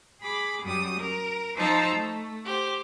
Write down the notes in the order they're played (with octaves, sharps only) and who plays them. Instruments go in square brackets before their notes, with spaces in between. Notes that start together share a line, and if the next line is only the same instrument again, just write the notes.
[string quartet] G#4 B5 D6
F#2 G3 D#6
A#4
F3 D#4 C5 A5 A#5 E6
A3
G4 C5